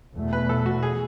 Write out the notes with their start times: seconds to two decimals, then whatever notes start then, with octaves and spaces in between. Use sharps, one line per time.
0.15 E2 B2 A3
0.33 B4
0.49 A4
0.66 F#4
0.83 G#4